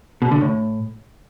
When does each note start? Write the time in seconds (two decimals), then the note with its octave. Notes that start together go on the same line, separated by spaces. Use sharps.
0.22 B2
0.31 D3
0.41 A2